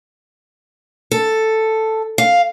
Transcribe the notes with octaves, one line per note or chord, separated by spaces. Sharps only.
A4
F5